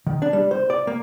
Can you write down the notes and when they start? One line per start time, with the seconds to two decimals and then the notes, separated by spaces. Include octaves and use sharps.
0.07 D#3
0.22 D4
0.33 G3
0.51 C5
0.70 D5
0.87 A#3